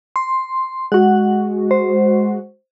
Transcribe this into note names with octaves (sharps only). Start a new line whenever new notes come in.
C6
G#3 F#4 F#5
C5